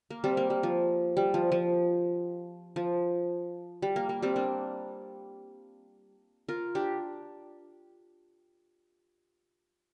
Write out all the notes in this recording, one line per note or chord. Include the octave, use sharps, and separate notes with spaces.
A#3
G3 C4
A#3
G3
F3
G3
F3
F3
F3
G3
A#3
A#3
G3 C4
A#3 D4
F4 A#4
D4 G4